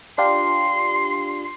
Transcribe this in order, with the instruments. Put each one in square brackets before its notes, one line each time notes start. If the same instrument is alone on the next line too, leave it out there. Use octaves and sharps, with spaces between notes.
[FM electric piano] D4 F4 G4 [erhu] C6